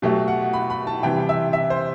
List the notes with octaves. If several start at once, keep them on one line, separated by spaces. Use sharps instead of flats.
B2 F#3 A3 G4
F#5
B5
B5
A5
C3 E3 G3 G5
E5
E5
C5